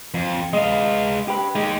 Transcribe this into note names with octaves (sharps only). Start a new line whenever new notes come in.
F2
G#3 D#5 F5
G4 B4
G#3 D#4 G4